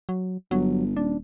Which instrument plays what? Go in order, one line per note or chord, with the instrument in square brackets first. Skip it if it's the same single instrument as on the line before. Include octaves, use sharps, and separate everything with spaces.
[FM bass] F#3
[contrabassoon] G1 [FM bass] F#3
[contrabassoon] D#1 [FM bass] D4